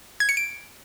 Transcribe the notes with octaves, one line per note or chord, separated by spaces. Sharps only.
G#6
C#7
D7